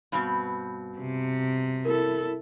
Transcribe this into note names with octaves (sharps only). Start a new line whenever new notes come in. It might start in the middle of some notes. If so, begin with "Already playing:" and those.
G2 B2 C4
C3
E4 A4 A#4